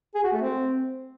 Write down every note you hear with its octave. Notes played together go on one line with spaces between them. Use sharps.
G#4
F#4
A3
C4